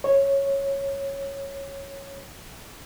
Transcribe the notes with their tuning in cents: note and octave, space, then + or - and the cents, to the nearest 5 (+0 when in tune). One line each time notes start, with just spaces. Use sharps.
C#5 -5